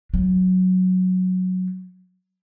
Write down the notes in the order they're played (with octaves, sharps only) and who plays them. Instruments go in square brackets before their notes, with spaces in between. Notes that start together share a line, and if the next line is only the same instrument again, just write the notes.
[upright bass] F#3